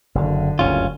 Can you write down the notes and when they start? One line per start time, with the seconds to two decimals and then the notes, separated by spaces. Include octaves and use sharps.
0.15 F#1 D3
0.59 F#1 D2 G2 C#4 F4